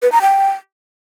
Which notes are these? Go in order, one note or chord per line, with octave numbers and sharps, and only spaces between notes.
B4
A#5
G5